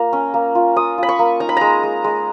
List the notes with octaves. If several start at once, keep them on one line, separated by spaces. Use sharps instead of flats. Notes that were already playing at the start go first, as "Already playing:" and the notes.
Already playing: A#3 F4 A#5
C#4
A#3
F4
F4 D#6
F4 B5
C#6
A#3
D#4 A#5
B5
G#3 A#5
G#3
G#3